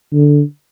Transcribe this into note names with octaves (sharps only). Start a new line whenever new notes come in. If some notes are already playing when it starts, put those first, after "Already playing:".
D3